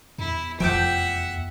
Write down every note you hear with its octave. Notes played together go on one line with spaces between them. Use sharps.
E2 E4
F1 C#2 F3 E5 F#5 G5 D6 G6